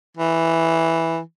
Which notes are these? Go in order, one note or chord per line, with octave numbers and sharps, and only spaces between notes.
E3